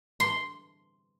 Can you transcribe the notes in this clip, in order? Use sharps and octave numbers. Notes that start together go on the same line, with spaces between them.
C6